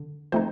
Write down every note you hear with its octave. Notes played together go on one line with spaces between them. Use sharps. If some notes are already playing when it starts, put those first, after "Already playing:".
Already playing: D3
F3 A3 C4 D#4 C5